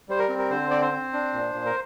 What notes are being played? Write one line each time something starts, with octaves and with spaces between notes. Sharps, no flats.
G3 C5
A#4
C4
A#4
D3 C5
C4 D5
C5
C4
D4
A#2
A#2
A#4